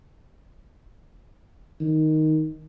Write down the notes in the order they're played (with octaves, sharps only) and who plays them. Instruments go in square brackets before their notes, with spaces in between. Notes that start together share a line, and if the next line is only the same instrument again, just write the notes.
[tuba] D#3